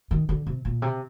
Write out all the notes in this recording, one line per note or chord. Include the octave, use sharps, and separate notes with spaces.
D#3
D3
C3
A#2
C3